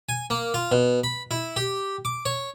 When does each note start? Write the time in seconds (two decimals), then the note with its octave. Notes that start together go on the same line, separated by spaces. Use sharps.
0.09 G#5
0.30 A#3
0.54 F4
0.71 B2
1.04 B5
1.31 E4
1.56 G4
2.05 D6
2.26 C#5